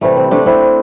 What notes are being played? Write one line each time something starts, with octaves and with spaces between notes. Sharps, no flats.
C3 E3 G3 A3
C4
A3 D4
C4 E4